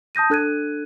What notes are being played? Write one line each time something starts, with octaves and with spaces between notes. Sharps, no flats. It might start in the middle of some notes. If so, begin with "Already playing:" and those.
A5 D#6 G6 A#6 D#7
D4 A4 F#6 G#6 D#7